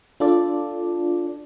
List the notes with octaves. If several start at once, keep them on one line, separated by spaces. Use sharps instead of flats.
D4 F4 A4 D5